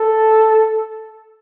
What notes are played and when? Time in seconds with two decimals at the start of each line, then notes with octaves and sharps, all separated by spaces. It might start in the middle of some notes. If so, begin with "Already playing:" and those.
Already playing: A4